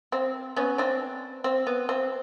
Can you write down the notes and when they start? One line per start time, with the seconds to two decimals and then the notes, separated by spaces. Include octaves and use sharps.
0.12 C4
0.56 B3 C#4
0.78 C4 D4
1.44 C4
1.67 B3
1.89 C4